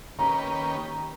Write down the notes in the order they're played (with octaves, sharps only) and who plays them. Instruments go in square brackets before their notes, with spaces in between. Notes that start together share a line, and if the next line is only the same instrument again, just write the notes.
[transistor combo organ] D#3 A#3 C#4 G4 B4 [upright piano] A#5